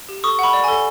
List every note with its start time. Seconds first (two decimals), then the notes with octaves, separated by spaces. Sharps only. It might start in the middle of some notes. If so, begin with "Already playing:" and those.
0.09 G4
0.24 A4 C#6 D#6
0.39 F#5 B5 C#6
0.53 D5
0.64 A4 G#5